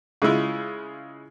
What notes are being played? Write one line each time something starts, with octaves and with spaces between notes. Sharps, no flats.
C#3 G#3 E4 F4